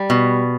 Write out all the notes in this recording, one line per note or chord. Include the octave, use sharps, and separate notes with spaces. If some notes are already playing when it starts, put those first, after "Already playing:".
Already playing: G3
B2